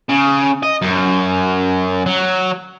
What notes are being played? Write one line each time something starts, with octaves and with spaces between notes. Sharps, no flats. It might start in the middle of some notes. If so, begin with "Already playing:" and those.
C#3
D#5
F#2
F#3